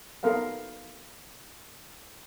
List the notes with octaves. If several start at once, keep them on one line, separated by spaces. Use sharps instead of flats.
B3 A4 A#4 F5 F#5